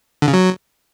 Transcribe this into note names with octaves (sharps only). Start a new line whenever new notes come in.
D3
C#3
F#3